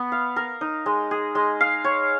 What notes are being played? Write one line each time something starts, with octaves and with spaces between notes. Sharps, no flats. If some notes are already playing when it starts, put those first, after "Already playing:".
Already playing: B3 B4
F5
A#4
D#4
G#3
G#4
G#3
F5
C#5